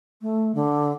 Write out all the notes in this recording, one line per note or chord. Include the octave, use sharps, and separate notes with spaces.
A3
D3